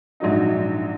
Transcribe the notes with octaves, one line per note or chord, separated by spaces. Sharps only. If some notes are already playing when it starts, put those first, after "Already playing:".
A#1 G#2 F#3 D#4